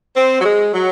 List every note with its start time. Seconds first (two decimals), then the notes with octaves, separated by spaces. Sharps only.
0.16 C4
0.41 F#3
0.45 G#3
0.74 F#3